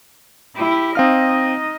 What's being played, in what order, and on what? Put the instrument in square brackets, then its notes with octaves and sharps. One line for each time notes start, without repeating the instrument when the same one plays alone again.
[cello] E4 G4
[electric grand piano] C4 F5 F6 [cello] D#4 D#5